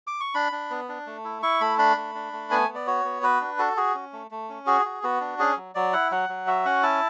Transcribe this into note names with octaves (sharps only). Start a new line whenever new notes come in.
D6
C#6
D4 B5
D4
B3
D4
A3
E4
E4 C#6
A3 B5
D4 B5
A3
D4
A3
B3 G#5
B3
D5
F#4 C#5
B3
F#4 B4
D4
F#4 A4
F#4 G#4
C#4
A3
A3
C#4
F#4 G#4
F#4
B3 F#4
D4
C#4 G#4
F#3
F#3 D5
E4 F#5
F#3 F#5
F#3
F#4 E5
C#4 F#5
E4 A5